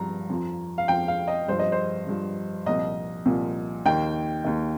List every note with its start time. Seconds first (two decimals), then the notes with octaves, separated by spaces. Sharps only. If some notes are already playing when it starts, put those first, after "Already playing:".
Already playing: G2 F3 A#5
0.29 F2 F3
0.78 F5
0.88 F2 F3 G5
1.08 F5
1.28 D#5
1.48 G2 F3 C5
1.59 D#5
1.72 C5
2.07 G2 F3
2.66 C2 A#2 F3 D#5
3.26 C2 A#2 F3
3.85 D#2 D#3 G5
4.44 D#2 D#3